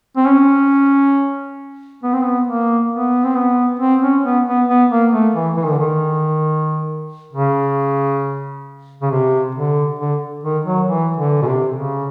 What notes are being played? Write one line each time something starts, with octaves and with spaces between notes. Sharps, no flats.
C4
C#4
B3
C4
B3
A#3
B3
C4
B3
C4
C#4
B3
B3
B3
A#3
A3
E3
E3
D#3
D3
D#3
C#3
C#3
C3
D3
D3
D#3
F#3
E3
D3
B2
C3
C#3